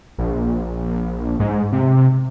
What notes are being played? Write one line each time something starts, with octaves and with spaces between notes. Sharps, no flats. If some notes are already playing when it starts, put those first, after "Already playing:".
A#1
G#2
C3